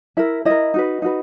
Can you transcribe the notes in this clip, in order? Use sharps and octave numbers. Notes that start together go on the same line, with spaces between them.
E4 A#4 E5
E4 A#4 D#5
D#4 F#4 B4
D#4 F#4 B4